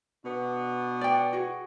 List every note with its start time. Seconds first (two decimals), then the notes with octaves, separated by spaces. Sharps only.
0.25 B2 B3 D4
1.01 D5 G5
1.33 F#4 G#4